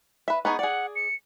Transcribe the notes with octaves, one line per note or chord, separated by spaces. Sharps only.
B4 E5
B3 D#4 G#4 C#6
G#4 D5 F#5
C#7